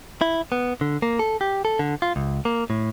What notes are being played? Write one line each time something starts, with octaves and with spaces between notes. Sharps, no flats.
E4
B3
D3
A#3
A4
G4
A4
D3
F4
C#2
A#3
A2